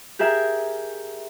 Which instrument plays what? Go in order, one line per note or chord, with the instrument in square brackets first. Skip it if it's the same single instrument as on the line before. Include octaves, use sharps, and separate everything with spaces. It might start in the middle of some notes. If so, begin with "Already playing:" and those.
[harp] G4 G#4 A#4 E5